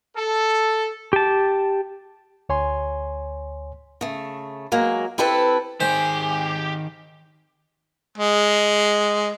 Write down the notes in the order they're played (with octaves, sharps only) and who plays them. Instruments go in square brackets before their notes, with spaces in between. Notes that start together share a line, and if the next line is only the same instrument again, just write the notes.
[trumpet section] A4
[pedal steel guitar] G4 A5
[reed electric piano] D2 C#5 G#5 C6
[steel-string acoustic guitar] C#3 A3
F#3 G#3 A#3
C4 E4 G4 A4 B4
[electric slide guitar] D#3 G#4 [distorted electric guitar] G4 [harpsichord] C5 [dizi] G#5
[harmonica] G#3